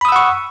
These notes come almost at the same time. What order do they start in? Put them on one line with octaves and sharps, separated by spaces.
B5 D#6 E6 F#5 C#6